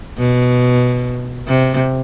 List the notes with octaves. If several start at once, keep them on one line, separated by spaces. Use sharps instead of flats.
B2
C3